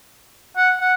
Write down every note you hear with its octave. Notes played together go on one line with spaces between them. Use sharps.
F#5
F#5